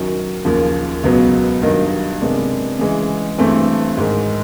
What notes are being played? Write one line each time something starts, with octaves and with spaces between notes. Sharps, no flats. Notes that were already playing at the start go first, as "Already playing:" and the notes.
Already playing: F#2 D#3 F#3
D#2 C#3 F3 A#3
C#2 B2 F#3 B3
G2 D#3 F#3 A#3 D#4
C3 D#3 G#3 B3 D4
C#3 E3 G#3
G2 E3 A3 C4
G#2 D#3 G#3